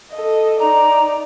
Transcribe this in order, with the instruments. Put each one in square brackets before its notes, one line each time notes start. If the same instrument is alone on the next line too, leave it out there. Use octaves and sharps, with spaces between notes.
[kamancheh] A4 D#5
[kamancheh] D#4 D5 [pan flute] A#5